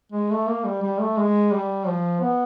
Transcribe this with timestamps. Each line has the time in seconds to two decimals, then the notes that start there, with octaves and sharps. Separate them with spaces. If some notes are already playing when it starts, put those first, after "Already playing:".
0.12 G#3
0.30 A3
0.48 A#3
0.64 G3
0.82 G3
1.00 A3
1.17 G#3
1.52 G3
1.87 F3
2.21 B3